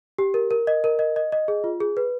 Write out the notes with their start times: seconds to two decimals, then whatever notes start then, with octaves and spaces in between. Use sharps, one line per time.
0.18 G4
0.34 A#4
0.51 A#4
0.67 D#5
0.84 A#4
0.99 D#5
1.16 D#5
1.32 D#5
1.48 G#4
1.64 F4
1.80 G#4
1.97 B4